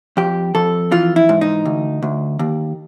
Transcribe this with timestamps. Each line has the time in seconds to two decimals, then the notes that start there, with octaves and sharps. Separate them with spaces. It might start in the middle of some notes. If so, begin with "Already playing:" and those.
0.17 F2 G4
0.55 F2 A4
0.92 E3 F4
1.16 E4
1.29 G#2
1.41 D#4
1.65 D2
2.03 D2
2.39 D#2